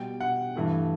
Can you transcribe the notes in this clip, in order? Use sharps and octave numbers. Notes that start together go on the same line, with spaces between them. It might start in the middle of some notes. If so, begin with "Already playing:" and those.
Already playing: B2 G3 G5
F#5
G2 E3 A3